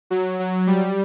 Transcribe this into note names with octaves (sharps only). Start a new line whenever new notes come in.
F#3
F#3
G3